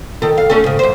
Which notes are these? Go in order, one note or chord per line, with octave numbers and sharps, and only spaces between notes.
D#3 A4
F5
A3 C#4 A4
G#2 C#3
F#2 C5